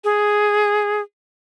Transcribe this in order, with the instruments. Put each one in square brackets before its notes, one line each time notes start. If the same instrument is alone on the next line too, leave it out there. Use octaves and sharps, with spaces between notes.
[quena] G#4